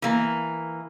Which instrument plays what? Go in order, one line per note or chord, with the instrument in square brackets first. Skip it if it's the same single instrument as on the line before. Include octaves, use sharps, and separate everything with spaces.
[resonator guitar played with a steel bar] E3 A#3